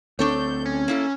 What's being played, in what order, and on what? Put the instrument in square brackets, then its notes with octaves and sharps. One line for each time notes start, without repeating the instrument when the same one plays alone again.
[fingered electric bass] D2 C4 [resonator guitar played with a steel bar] D4 A4 C#5 [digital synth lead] G6
[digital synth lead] C#4
[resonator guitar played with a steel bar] A#3 E4 A4